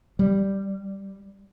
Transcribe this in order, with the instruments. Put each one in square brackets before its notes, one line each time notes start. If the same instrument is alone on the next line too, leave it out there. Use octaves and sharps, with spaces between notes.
[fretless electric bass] G3